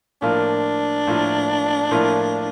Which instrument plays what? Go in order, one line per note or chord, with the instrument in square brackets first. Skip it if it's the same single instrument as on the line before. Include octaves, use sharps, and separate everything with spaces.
[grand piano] A2 F3 A#3 F4 A#4 [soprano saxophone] D4
[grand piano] A2 F3 A#3 F4 A#4
A2 F3 A#3 F4 A#4